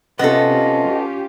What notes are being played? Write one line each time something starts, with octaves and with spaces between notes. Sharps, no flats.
C3 B3 C#4 F4 A4 D#5
G4